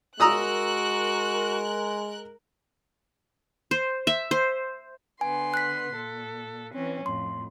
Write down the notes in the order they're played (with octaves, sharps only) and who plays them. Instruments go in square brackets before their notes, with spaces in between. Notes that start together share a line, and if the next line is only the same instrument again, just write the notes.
[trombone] G#3 [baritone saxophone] F#4 [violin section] A#4 F#6 [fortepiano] A#5 D#6 E6
[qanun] C5
E5
C5
[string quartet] D3 B3 C6 [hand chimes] G#5
[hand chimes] F#6 B6
[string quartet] A#2 A4
E3 C4 C#4
[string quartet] F2 A2 [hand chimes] C6